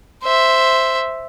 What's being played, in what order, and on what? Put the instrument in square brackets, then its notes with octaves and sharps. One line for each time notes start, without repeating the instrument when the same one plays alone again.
[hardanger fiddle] C5 E5